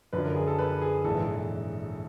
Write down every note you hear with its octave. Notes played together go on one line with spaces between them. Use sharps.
F#2 D3 F3 B4
A#4
G#4
A4
B4
G#4
A#1 G#2 E3 A4